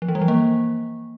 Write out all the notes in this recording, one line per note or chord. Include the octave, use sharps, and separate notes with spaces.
F3
E3
G3
F3
A#3